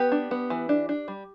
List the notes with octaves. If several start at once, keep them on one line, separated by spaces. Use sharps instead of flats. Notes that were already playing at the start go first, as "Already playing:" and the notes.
Already playing: B3 G4 B4
D4
B3
E3
D4
D4
G3